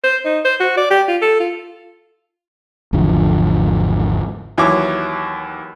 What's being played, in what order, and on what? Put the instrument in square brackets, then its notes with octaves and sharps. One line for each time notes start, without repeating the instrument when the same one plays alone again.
[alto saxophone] C5
D#4
C5
F#4
D5
G4
F4
A4
F4
[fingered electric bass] G#1 E2 D3 F3
[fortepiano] D#2 E3 F#3 C#5 C#6 D6